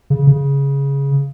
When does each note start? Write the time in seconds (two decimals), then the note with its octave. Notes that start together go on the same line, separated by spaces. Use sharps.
0.10 C#3
0.27 C#3